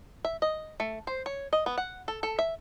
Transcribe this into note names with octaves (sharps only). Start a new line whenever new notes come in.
E5
D#5
A3
C5
C#5
D#5
B3
F#5
A4
A4
E5